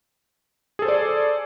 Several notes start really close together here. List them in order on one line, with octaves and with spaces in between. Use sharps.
G#4 A4 C5 D5